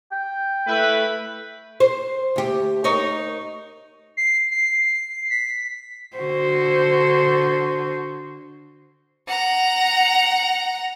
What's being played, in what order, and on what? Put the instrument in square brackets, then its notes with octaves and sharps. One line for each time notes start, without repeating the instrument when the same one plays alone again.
[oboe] G5
[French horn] A3 [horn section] E4 B4
[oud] C5
D2 G4
D#4 A#4 C#5
[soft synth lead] C7
C7
B6
[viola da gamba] D3 F#4 C5
[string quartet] F#5 A#5